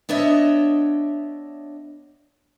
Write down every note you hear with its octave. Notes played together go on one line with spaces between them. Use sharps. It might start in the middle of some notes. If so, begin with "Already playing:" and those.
B3 D4 C#5 D#5 E5